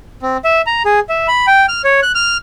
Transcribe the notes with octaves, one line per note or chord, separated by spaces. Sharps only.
C4
E5
A#5
G#4
E5
B5
G5
F6
C#5
F#6
F6